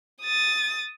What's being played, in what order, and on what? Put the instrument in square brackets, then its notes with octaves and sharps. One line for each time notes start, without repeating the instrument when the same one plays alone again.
[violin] D#6 A6